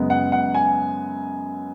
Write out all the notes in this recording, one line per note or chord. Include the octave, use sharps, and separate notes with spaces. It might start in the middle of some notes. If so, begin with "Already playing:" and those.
Already playing: F#2 C#3 G#3 B3
F#5
F#5
G#5